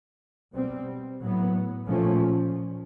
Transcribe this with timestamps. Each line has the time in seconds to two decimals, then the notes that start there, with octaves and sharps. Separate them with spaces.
0.53 B2 G3 C4
1.21 A2 F#3 B3
1.89 A#2 F3 A3 C#4